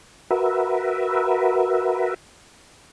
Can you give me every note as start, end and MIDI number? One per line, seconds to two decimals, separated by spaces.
0.31 2.14 66
0.31 2.14 70
0.31 2.14 71
0.31 2.14 76